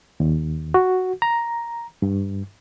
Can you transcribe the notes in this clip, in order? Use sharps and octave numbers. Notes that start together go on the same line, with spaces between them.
D#2
F#4
A#5
G2